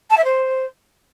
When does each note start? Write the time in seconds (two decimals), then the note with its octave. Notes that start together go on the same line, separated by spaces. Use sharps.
0.10 A5
0.17 E5
0.24 C5